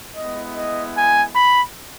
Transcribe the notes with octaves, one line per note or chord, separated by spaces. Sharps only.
G#3 B3 E4 D#5
D#5
G#5
B5